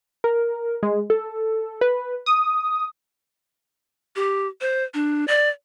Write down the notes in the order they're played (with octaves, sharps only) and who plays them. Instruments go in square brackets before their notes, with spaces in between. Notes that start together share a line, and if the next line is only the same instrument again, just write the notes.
[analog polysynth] A#4
G#3
A4
B4
D#6
[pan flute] G4
C5
D4
D5